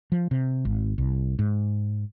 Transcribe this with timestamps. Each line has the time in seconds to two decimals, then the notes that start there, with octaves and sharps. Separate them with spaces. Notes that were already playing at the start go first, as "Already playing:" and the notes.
0.12 F3
0.31 C3
0.65 G#1
0.98 C2
1.39 G#2